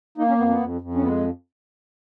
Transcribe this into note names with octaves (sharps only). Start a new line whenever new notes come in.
A#3 D#4
C#4
F2 B3
B3
F2
F2
C#4
G#3 B3